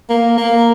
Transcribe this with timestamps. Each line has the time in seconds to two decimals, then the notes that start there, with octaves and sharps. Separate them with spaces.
0.10 A#3
0.37 A#3